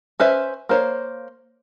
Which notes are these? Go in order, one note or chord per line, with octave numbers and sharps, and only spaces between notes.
C#4 B4 C5 E5
A#3 C5 C#5